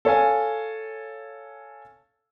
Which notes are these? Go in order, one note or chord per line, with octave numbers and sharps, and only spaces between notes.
A4 C#5 F5 G#5